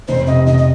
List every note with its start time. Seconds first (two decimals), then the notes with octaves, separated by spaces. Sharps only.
0.08 F1 C5
0.27 C3 D#5
0.47 F1 D#5
0.58 D#5